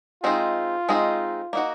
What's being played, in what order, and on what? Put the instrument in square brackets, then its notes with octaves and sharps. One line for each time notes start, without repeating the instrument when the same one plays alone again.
[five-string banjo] G#3 C4 D#4 G#4 [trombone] F4
[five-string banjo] G#3 C4 D#4 G#4
A#3 D#4 F#4